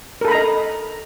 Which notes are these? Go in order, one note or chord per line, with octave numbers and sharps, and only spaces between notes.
A4 A#4 D#5 A#5 B5